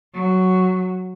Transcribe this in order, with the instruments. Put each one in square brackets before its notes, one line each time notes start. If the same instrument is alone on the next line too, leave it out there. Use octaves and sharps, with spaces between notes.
[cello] F#3